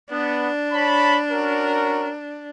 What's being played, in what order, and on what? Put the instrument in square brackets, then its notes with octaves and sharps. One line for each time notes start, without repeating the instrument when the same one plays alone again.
[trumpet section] B3 [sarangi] D4
[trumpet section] C#5 A5 B5
C#4 F#4 A#4